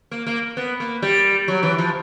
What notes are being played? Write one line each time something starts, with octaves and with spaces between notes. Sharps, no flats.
A#3
A#3
B3
A#3
G3
F#3
E3
F3